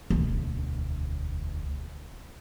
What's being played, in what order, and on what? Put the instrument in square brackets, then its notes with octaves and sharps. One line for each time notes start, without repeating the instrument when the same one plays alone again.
[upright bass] E1 D2